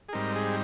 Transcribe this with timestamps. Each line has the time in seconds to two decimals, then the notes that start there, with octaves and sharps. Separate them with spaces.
0.09 G#4
0.13 G#2 G3 C4 D#4 A#4
0.36 G#4